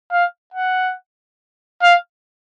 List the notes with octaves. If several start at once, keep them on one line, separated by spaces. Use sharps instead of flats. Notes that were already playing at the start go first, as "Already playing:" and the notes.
F5
F#5
F5